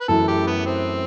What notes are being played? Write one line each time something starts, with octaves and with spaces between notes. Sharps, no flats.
B4
F#2 E3 A3 E4 A4
G4
B3
C4